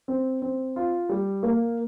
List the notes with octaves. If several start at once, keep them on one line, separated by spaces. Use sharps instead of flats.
C4
C4
F4
G3
A#3